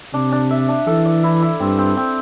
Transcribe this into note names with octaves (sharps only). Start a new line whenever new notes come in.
C3 D4
D4
E5
D4
E3 A4
D5
E4
E4
G2 C4
C4
C4